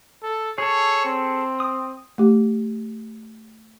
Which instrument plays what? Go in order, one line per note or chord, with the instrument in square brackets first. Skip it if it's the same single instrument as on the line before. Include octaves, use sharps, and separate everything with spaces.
[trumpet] A4
[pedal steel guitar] G#4 A4 [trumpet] C#5
[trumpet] C4
[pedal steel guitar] D#6
[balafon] A3 G4